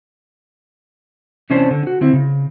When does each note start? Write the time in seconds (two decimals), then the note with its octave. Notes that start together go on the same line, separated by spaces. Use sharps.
1.50 C3 E3 C#4 D4 C5 A5
1.71 D3
1.87 F#4
2.01 D3 C4 E4
2.13 C#3